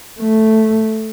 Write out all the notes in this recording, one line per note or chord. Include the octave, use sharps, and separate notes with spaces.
A3